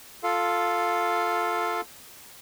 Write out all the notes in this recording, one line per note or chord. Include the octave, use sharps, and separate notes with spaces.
F4 A4 F5